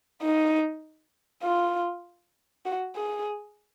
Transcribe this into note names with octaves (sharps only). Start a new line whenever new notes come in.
D#4
F4
F#4
G#4